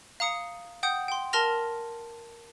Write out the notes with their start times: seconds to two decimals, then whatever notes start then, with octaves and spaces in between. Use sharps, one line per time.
0.20 F5 A#5 D#6 C#7
0.83 F#5 G5 D#6 G6
1.08 G5 C6
1.33 A#4 A5 C6 F6 A#6 F7